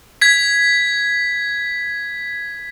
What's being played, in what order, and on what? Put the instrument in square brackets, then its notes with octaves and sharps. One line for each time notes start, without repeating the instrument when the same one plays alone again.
[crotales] G#6 B6